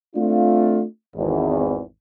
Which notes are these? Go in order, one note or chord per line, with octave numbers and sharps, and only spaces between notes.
A3 C4 D4 F4
G#1 E2